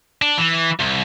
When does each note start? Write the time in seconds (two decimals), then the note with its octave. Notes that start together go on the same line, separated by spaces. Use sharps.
0.22 D4
0.38 E3
0.80 C2